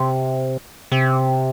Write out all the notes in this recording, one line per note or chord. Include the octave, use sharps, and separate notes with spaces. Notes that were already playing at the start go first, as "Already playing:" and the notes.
Already playing: C3
C3